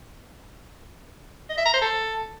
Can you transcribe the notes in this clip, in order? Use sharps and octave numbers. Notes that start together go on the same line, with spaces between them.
D#5
E5
A#5
C5
A4